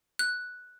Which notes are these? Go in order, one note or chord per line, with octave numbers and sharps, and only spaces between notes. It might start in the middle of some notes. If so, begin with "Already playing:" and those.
F#6